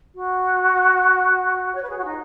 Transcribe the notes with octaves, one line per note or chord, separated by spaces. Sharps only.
F#4
C#5
B4
G#4
F#4
D#4